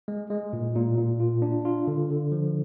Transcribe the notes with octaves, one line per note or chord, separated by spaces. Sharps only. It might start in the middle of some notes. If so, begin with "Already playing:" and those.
G#3
G#3
A#2
A#2
A#2
F4
D4
F4
D3
D3
F3